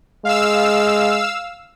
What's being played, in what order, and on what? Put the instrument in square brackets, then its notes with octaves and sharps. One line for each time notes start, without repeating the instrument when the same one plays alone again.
[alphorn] G#3 [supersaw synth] F5 E6